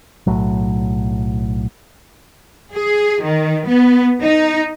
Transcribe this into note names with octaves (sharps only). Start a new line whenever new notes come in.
B1 A2 F#3
G#4
D#3
B3
D#4